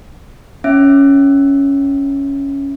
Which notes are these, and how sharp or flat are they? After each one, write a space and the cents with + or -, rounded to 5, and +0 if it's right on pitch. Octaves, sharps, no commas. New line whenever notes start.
C#4 +5 E5 +0